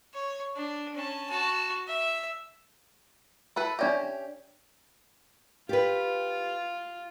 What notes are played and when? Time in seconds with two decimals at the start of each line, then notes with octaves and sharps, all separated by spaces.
0.13 C#5
0.56 D4
0.94 C#4 A5
1.30 F#4 A5
1.87 E5
3.56 E4 A4 B4
3.79 C#4 D4 G4 D5 E5
5.69 F4 G4 B4